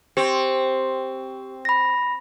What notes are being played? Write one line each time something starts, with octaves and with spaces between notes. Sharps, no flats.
C4 G4
B5 A#6